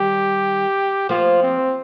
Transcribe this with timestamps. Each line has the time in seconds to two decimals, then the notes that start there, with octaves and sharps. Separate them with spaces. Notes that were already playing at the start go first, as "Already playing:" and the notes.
Already playing: D#3 G3 G4
1.09 F3 A#3 F4
1.42 C4